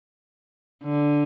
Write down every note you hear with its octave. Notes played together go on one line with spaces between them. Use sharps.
D3